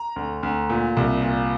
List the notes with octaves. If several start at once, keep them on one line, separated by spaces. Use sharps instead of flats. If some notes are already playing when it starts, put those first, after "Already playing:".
Already playing: A#5
D2
D2
A#2
C2
A#2